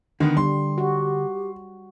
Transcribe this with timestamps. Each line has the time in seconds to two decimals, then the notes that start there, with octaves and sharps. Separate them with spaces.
0.20 D3 D#3 B3
0.37 G3 C6
0.78 F#4 G4